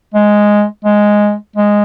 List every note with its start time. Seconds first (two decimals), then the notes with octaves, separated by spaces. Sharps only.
0.14 G#3
0.85 G#3
1.56 G#3